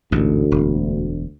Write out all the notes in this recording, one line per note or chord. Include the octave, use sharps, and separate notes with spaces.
A1 D2 G#2 B2
E1